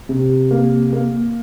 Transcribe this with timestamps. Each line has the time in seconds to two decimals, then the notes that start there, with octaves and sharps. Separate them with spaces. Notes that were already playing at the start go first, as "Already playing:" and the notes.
0.09 C3
0.51 A#3
0.93 A#3